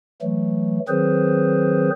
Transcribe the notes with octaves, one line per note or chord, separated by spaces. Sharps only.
E3 F#3 A3
D#3 F#3 C4 G#4 B4 C5